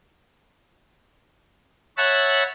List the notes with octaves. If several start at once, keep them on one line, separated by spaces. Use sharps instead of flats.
C#5 E5 F#5 A5 B5